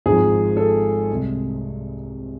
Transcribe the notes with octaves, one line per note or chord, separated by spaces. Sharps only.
G#1 G#2 F3 G#4
A4
C2 C3 G#3